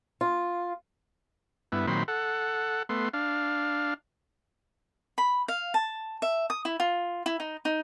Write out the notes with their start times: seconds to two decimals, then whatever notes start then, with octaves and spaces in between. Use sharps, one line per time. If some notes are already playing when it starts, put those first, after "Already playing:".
0.21 F4
1.72 G2 B3 E4
1.87 A#2 D#3 F#3 C4 B5 C6
2.08 A4 F#5
2.89 A3 B3 C6
3.14 D4 F5
5.18 B5
5.48 F5
5.74 A5
6.22 E5
6.50 D#6
6.65 E4
6.80 F4
7.26 E4
7.40 D#4
7.65 D#4